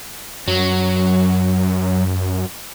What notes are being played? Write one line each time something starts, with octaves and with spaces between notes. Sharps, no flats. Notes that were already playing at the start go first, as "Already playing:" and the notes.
F#2 F#3